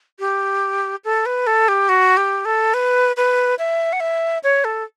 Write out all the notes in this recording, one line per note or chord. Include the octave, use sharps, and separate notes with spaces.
G4
A4
B4
A4
G4
F#4
G4
A4
B4
B4
E5
F#5
E5
C#5
A4